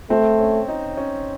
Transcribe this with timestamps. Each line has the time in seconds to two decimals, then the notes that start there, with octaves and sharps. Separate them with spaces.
0.10 A3 C4
0.39 C#4
0.68 D#4
0.97 C#4